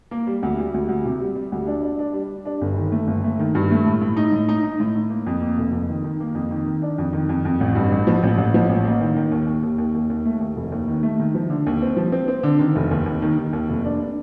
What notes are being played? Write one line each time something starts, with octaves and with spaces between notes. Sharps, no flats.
A#3
G3
D2
G3
D2
D2
C3
G3
G3
D2
D4
D4
D4
G3
G3
D4
G1
D#3
A3
G1
A3
D#3
G2
A3
A2
A2
D#4
A2
D#4
D#4
A2
A2
A#3
F2
A#3
F1
F2
D#3
D#3
A#3
F2
D#3
D#3
D4
F2
D#3
F2
F2
A1
G2
A1
F3
A1
A1
F3
A1
A#3
D#3
D#3
D#2
D#2
D#2
D#2
D#2
D#2
A3
D#2
F1
D#2
D#3
A3
D#3
F3
D3
D#2
C4
F3
C4
C4
D3
D#3
F1
D#2
D#2
D#3
D#3
D#2
F1
D4
D4